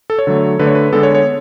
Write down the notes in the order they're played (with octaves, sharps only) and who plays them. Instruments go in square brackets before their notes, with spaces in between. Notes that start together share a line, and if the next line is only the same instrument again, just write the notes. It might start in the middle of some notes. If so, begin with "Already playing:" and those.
[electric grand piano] A4
C#5
D3 F#3 A3
D3 A3 B4
C#5
B4
D3 G#3 B3 A4
C#5
C#5